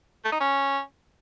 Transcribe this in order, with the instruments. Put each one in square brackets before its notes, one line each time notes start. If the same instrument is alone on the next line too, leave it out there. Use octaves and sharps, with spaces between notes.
[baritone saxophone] A3
D#4
C#4